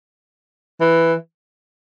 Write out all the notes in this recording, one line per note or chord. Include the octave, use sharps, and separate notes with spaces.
E3